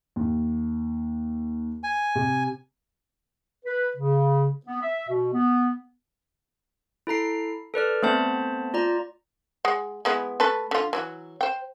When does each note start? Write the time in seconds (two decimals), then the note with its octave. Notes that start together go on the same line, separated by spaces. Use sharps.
0.16 D#2
1.84 G#5
2.15 C3
3.65 B4
3.97 C#3
4.66 B3
4.82 E5
5.08 B2
5.33 B3
7.07 E4 A4 A#5 C7
7.74 A4 B4 D5 F6
8.03 A3 B3 C4 C5 E5 A5
8.74 F4 D5 A#5
9.65 G#3 F#5
10.05 G#3 B3 E4
10.40 A3 A4 B4
10.71 D3 F4
10.93 E3 F#3
11.41 C5 G5